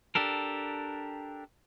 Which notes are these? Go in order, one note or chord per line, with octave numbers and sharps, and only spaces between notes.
D4 G4 A4 A#4